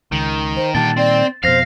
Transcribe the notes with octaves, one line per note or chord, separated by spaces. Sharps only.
C#2 D#3
C5
A#2 D3 D#3 G3 G5 A5 A6
C4 D5
F2 B2 C5 F5 F6 A#6 C7